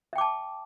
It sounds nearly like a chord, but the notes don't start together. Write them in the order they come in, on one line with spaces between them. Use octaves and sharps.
E5 G5 D6 A5